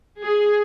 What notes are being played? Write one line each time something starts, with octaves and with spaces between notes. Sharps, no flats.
G#4